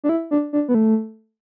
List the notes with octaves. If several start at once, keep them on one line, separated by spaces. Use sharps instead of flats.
D4
E4
D4
D4
B3
A3